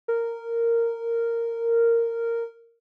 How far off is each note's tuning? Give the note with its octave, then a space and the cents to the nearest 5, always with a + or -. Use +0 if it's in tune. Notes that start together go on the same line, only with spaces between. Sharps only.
A#4 -10